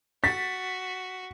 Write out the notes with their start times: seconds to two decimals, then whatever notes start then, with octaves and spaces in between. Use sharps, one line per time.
0.24 F#4 A6 B6